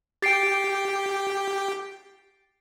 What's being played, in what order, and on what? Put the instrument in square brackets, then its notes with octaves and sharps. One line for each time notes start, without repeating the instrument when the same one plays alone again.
[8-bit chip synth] G4 G5 [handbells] A6 C7 D7